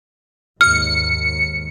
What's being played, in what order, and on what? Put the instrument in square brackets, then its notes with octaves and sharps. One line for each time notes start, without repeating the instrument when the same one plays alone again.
[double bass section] D#2 G#2 [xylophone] F6 [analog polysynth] C#7